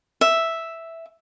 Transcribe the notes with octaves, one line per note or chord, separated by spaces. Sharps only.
E5